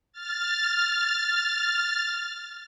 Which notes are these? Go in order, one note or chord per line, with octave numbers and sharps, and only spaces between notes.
F6 A6